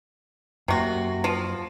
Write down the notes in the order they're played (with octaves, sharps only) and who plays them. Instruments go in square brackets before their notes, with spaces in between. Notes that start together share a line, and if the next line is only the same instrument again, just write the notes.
[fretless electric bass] F#2 A#3 [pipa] C3 F#4
[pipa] F3